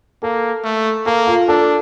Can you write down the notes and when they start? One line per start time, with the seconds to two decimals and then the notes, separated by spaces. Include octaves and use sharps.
0.23 A#3 A4
0.65 A3
1.06 A#3 A4
1.27 F4
1.48 D4 A4